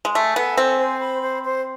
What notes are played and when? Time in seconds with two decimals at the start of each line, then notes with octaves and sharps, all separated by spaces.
0.05 G#3
0.15 A3 G#5
0.36 B3 A4
0.57 C4 G#5
0.79 C5
1.00 B5
1.22 C5
1.43 C5